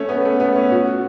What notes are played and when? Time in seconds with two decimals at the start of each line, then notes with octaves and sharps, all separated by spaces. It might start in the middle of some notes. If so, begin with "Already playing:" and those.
Already playing: A3 C#4
0.09 B3
0.25 A3
0.40 B3
0.56 C#4
0.72 F#4